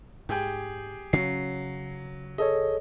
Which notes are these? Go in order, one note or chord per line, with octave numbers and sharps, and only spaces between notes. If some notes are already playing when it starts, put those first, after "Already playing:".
G#2 G4 G#4 G5
C#3 F#3 C#4 C7
G#4 A4 C#5 D#5